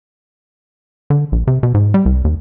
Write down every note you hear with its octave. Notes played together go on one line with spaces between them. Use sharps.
D3
A#1
C3
B2
G#2
G3
C2
D#2